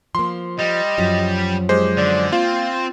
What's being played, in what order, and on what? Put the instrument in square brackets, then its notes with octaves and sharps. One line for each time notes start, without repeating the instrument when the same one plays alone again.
[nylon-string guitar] F3 A#3 [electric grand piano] C6
[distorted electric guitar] G3 [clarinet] D#5
[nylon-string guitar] F#2 F3 F#3
[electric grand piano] G#3 C5 [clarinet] G4
[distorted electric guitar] D3 [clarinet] D5
[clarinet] A#3 [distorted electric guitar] C4 [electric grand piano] F4